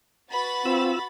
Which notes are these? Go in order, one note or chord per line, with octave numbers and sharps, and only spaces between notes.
F#4 B4 B5 A6
C4 F4 E6